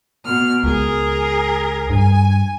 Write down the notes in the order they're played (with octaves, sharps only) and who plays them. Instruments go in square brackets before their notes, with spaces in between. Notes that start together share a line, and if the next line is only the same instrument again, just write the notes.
[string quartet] B2 F6
[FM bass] C#2 [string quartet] G#4 A#4
[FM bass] G2 [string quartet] G#5